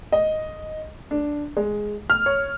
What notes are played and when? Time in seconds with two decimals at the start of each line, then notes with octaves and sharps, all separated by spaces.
0.12 D#5
1.11 D4
1.57 G#3
2.10 F6
2.26 C#5